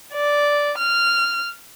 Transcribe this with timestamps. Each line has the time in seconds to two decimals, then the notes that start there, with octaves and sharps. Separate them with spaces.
0.13 D5
0.78 F6